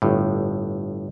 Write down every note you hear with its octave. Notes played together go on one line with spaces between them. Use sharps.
G1 A2